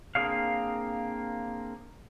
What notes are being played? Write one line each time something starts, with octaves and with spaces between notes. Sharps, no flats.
A#3 C4 D4 G#4 C#5 F5